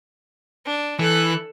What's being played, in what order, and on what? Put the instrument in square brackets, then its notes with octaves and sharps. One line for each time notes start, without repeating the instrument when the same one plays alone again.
[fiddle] D4
[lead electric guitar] E3 [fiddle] A4 F#6